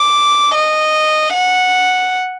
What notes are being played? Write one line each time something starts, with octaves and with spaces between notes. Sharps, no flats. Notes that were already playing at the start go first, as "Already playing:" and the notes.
Already playing: D6
D#5
F#5